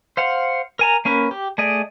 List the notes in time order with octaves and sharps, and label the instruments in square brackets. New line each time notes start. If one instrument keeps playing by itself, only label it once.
[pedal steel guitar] C5 F5 F#5
A#4 G#5 A#5
A#3 C#4 A#4 B4
G4
A3 G#4 D5 D#5